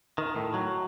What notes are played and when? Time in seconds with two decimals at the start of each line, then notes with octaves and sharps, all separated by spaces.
0.18 D#3
0.36 A2
0.54 F#3